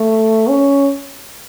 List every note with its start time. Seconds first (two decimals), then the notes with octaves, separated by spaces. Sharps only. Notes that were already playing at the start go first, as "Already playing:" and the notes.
Already playing: A3
0.49 C#4